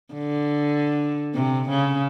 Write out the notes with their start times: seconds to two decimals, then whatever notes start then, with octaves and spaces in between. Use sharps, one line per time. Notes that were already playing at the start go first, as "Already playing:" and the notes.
0.14 D3
1.34 C3
1.69 C#3